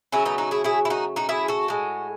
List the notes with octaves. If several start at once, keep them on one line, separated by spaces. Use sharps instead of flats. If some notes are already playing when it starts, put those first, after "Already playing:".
C#3 F#3 A3 C#4 E4
B3 D#4
D#4 F#4
E4 G#4
E4 G#4
E4
D#4 F#4
D#4 F#4
E4 G#4
F#4 A4
A2 G#3